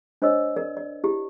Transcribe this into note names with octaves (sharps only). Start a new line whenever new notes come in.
D4 C5 C#5 D#5 E6
A#4 D5
D5
E4 G4